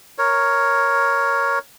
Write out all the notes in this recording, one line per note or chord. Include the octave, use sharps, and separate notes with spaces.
A#4 C#5